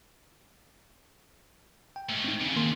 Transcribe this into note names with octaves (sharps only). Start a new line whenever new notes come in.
G5
G#2 A3
C4 D#4
D#2 C#3
D#3 A#3 C6